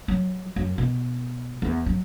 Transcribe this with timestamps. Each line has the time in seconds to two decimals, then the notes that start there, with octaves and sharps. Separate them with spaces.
0.08 F#3
0.56 F#2
0.78 B2
1.62 E2
1.86 F#3